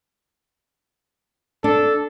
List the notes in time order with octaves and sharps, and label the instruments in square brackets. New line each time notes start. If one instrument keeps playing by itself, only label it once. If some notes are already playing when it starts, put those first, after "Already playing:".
[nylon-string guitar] D4 [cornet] A4